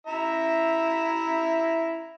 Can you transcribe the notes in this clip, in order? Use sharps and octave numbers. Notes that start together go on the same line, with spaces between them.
E4 E5 A#5